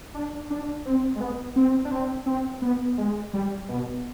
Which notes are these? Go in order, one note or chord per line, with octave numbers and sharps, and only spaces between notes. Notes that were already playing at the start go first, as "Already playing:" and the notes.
D4
D4
C4
G#3
B3
C4
D4
C4
C4
B3
G#3
G3
B2